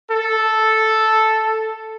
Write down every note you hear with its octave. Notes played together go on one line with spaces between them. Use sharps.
A4